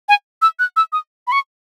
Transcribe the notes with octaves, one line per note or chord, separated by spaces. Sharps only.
G#5
E6
F#6
E6
D#6
B5
C#6